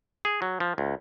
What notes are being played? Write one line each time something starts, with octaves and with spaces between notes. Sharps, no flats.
G#4
F#3
F3
C#2